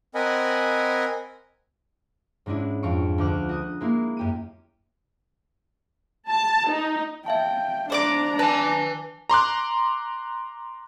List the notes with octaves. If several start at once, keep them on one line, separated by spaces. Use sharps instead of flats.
C4 A#4 D#5 F#5 G#5 B5
G#2 G#3 C#4 D4 E4
F2 F5 C#6 D7
D2 F#5 D6 F6
F#4 D#6
G#3 A#3 E4
F#2 G4 D#7
A5
D#4
E5 F5 G5 A5
D4 C5 D5 A#5 D6
B4 G#5 A5
A#5 C6 D6 F#6